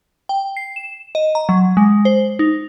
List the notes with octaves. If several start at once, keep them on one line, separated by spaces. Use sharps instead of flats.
G5
C7
E7
D#5
A#5
F#3
G#3
C5
D#4